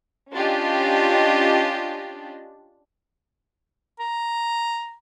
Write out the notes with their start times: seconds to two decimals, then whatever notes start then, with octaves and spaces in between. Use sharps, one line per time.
0.33 C#4 D4 F4 G4 D#5
3.99 A#5